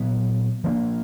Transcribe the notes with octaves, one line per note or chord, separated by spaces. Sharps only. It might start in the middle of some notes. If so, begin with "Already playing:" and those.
Already playing: A#2 F#3 B3
F3 A#3 D4